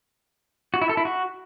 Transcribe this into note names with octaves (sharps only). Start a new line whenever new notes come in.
F#4
E4
A4
E4
F#4